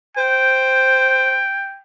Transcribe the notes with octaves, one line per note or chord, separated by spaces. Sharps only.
C5 G5